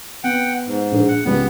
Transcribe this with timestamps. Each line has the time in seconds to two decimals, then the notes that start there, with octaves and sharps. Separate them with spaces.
0.24 B3 F#5 G5
0.66 G#2
0.91 A#1 G#4
1.08 F#5
1.25 C#2 G3 B3